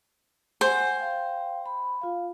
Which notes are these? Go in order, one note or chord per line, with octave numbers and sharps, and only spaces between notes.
C5 F#5 G#5
F5 G5
B5
F4 F5